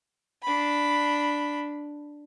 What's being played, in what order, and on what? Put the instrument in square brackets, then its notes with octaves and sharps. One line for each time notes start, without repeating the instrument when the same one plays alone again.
[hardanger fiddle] D4 B5